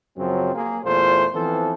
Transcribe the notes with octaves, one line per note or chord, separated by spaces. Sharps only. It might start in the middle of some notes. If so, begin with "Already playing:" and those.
F#2 C#3 F3 F#3 C4
A#3 G#4
E2 A#2 A3 F4 C5
E3 F3 B3 C4 A4